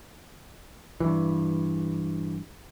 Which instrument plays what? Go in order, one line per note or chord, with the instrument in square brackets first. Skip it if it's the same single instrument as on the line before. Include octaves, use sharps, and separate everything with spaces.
[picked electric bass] G2 E3